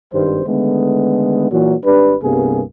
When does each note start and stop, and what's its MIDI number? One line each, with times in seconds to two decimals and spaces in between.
0.14 0.45 32
0.14 0.45 43
0.14 0.45 51
0.14 0.45 55
0.14 0.45 72
0.46 1.48 50
0.46 1.48 51
0.46 1.48 56
0.46 1.48 57
0.46 1.48 59
1.51 1.75 46
1.51 1.75 52
1.51 1.75 54
1.84 2.15 32
1.84 2.15 55
1.84 2.15 62
1.84 2.15 67
1.84 2.15 71
2.22 2.62 36
2.22 2.62 43
2.22 2.62 48
2.22 2.62 58
2.22 2.62 59
2.22 2.62 68